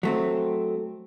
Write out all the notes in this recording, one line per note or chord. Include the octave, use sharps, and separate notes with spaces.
F#3 A3 C4